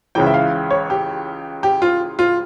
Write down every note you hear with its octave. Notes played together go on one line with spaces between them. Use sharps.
C#2 C#3 E3 G5
E5
F5
C#5
G4
G4
F4
F4